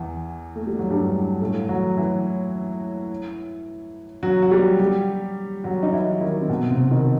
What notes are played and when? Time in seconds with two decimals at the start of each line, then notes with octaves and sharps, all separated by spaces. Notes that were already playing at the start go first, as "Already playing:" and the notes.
Already playing: E2 E3
0.56 A3
0.67 G3
0.79 F#3
0.90 G2 G3
1.41 A2 A3
1.69 F#3 F#4
1.97 E3 E4
4.23 F#3 F#4
4.42 F#4
4.51 G3 G4
4.79 G3 G4
5.64 F#3 F#4
5.83 D#4
5.92 E3 E4
6.21 D#3 D#4
6.41 C4
6.49 B2 B3
6.70 C3 C4
6.91 D#3 D#4